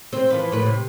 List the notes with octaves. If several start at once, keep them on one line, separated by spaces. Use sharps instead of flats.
C4 C5
E3 F3 B4
A2 B4
C3